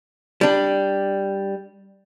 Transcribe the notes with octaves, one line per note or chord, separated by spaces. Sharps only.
G3 D4